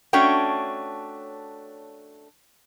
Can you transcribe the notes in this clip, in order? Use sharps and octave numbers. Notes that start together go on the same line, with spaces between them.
A3 C#4 D4 F#4 C#5 G5